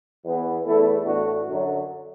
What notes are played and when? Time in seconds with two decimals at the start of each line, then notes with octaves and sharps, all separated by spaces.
0.24 E2 E3 B3
0.64 E2 E3 A3 E4 A4
1.05 A2 E3 A3 D4 F#4
1.45 F#2 D3 F#3